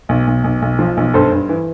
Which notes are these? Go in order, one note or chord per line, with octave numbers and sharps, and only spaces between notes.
B1
B1
B1
B1
F3
B1
G2 A4 C5
G2
E3